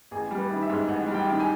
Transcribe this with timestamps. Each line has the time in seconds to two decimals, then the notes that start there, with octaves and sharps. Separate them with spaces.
0.11 A1 G#4
0.31 G3
0.38 B4
0.50 D#3
0.63 E5
0.70 G#2
0.88 A1 F#5
1.08 G3
1.14 G5
1.27 D#3
1.40 G#5